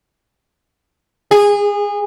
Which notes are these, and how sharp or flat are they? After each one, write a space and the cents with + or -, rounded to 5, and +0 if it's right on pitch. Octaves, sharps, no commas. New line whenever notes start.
G#4 -25